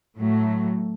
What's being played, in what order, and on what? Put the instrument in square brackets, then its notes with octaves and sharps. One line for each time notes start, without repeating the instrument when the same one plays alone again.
[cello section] A2 F#3 A3